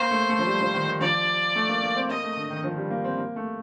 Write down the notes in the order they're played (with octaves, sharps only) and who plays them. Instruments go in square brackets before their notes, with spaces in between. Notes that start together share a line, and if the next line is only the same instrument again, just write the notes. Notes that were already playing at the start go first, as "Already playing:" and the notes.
Already playing: [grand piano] A#3 [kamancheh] C5
[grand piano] A3
A3
F3
G3
F3
D#3
D#3
[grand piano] F3 [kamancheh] D5
[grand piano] A3
A#3
A#3
C4
[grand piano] A#3 [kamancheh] D#5
[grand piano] A3
D3
D#3
F3
G3
A#3
C4
A#3
A3